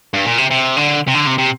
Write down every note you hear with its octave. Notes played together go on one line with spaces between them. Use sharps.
G2
A#2
C3
C3
D3
C3
D3
C3
C3